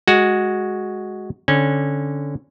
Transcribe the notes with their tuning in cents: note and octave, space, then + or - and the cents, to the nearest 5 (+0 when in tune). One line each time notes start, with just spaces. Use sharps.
G#3 +0 F#4 +0
D3 -15 C#4 -20